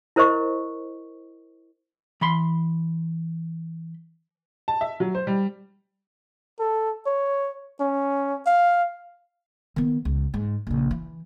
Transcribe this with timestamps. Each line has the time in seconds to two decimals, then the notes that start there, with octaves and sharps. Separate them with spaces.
0.16 E4 A#4 C5 D#5 C#6
2.21 E3 B5 C6
4.68 A5
4.81 E5
5.00 F#3
5.15 C5
5.27 G3
6.59 A4
7.06 C#5
7.80 C#4
8.46 F5
9.76 D#3 B3
10.05 C#2
10.34 G#2
10.67 A#1 C#3
10.91 E3